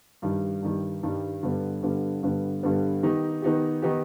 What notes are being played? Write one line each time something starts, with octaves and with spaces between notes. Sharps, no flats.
G2 D#3 G3
G2 D#3 G3
G2 D#3 G3
G2 D3 G3 B3
G2 D3 G3 B3
G2 D3 G3 B3
G2 D3 G3 B3
D#3 B3 D#4 G4
D#3 B3 D#4 G4
D#3 B3 D#4 G4